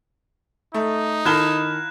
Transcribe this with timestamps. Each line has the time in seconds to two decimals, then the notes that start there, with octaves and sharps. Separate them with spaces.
0.74 A3 D#4
1.25 D#3 E4 A4 F5 A#5 F#6 E7 G7